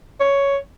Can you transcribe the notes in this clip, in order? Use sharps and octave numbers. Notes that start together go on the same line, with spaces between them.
C#5